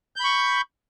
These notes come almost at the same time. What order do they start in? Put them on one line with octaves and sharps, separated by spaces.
G6 B5 C#6